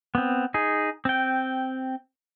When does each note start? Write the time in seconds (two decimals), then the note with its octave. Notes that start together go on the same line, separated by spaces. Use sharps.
0.15 B3 C4
0.54 D#4 G#4
1.05 C4 G5